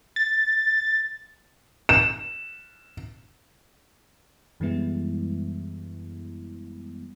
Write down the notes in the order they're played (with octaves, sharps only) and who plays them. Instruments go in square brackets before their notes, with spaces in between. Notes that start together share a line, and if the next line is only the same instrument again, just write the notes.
[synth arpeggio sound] A6
[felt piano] E7
[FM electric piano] F#2 E3 G3 G#3 B3 E4